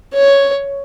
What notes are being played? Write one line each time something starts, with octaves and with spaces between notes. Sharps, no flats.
C#5